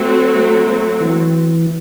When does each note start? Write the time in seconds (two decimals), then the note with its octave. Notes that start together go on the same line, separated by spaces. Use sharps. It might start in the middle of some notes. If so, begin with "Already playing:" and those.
Already playing: F#3 A3 C4 F#4
0.38 A3
0.71 A3
1.01 E3